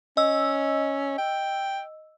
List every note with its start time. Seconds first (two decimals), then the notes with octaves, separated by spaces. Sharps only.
0.17 C#4 D#5 E6
1.18 G5